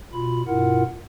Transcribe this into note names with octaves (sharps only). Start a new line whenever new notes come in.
B2 F4 B5
G2 B2 E4 F4 A#4 F#5